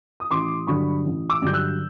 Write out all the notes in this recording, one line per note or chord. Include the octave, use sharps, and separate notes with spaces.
D#6
A1 C6 D6
G2 D3 F#3 B5 C#6
A1
D6 E6
G2 D3 F#3 G6
E6 F#6